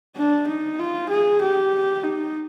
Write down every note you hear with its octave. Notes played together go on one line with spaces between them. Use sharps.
D4
D#4
F4
G#4
G4
D#4